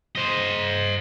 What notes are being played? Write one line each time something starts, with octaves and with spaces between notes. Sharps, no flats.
C5 D#5